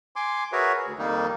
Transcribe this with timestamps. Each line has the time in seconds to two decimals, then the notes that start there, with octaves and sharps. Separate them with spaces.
0.16 G#5 C6 D6
0.53 F#4 G#4 A#4 B4 C#5 E5
0.85 D2
0.99 F2 D#3 G3 A#3 D#4